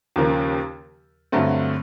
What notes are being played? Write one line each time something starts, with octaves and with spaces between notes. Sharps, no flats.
D#2 C#3 F3 A#3
G2 D3 F#3 A3 C4